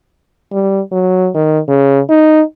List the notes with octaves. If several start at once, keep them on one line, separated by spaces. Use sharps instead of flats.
G3
F#3
D#3
C#3
D#4